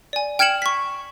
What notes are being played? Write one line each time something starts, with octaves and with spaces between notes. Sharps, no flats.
D5 G#5
G5 F6 G#6 C#7 E7 F#7
C#6 B6